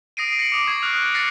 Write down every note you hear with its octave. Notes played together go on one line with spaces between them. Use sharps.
D#6 A#6 C7 D7 D#7
A#6 C#7 D7 F#7
D6 D#6
C#6 G#6 C7
D#6 F6 F#6
F#6 A6 A#6 C7 C#7